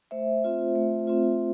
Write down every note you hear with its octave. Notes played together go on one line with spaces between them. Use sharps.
A3 C5 E5
C4 F4
A3
C4 F4